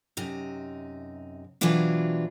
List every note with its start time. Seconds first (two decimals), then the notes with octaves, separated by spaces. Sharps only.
0.17 F#2 C3 D#4
1.61 B2 E3 F#3 C4 D4 F4